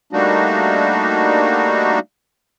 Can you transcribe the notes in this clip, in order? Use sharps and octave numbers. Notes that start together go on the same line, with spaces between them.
G3 A3 A#3 D4 D#4 F#4